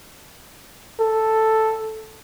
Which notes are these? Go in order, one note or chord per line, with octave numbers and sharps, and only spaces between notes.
A4